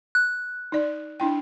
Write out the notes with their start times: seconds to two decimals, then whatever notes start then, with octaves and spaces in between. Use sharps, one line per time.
0.15 F#6
0.72 D#4 D5
1.20 D4 E4 G5